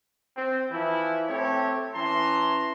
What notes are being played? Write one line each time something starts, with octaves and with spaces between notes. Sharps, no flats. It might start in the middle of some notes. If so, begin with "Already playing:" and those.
C4
E3 F3 E4
A3 C4 G4 A4 C#5
E3 C#4 A5 A#5 C6